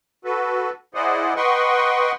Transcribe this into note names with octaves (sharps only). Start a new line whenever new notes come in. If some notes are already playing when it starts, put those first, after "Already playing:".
F#4 A4 B4
E4 G#4 C5 D5 D#5 F#5
B4 D#5 F#5 G5 C6 C#6